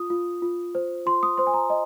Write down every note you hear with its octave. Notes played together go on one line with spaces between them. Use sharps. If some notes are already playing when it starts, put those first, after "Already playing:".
Already playing: F4 D#6
F4
F4
C5
F4 C6
D#6
C5 C6
G#5
A#5
D#5